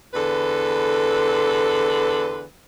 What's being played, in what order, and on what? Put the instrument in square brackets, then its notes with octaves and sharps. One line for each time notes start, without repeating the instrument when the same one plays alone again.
[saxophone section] E2 D3 A4 B4